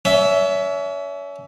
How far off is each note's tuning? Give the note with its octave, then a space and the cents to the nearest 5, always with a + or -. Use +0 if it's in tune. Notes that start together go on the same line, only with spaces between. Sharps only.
C#4 +35 E5 +0